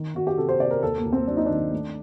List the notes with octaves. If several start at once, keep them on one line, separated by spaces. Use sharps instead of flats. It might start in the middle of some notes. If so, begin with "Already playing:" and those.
Already playing: D#3
D#3 F#4
G4
C3 A4
C5
C3 D5
A#4
D#2 A4
A#3
D#2
C4
F#3 D4
D#4
D#3 D4
A3